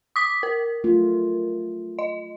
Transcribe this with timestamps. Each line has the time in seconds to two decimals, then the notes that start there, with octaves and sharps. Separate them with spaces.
0.16 D6 D#6 B6
0.43 A#4
0.84 F#3 A3 F4
1.99 D#5